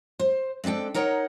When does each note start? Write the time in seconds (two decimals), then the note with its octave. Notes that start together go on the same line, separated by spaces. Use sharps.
0.19 C5
0.64 G#3 C4 D4 A4 G5
0.94 D#4 A#4 C#5 D#5 F#5